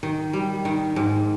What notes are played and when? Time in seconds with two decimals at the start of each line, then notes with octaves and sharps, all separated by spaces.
0.03 D#3
0.33 G3
0.65 D#3
0.96 G#2